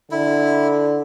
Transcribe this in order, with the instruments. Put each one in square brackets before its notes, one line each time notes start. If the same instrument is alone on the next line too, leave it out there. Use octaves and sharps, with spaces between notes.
[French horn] D3 [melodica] E4